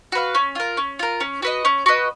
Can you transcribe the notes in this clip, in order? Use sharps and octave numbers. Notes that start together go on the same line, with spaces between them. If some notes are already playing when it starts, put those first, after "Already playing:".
F#4 B4 F5
C#4
F4 A#4
C#4
F4 A#4
C#4
F#4 B4 D#5
C#4
F#4 B4 D#5